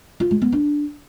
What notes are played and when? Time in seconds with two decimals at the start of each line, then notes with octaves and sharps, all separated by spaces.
0.20 F4
0.31 G#3
0.42 B3
0.52 D4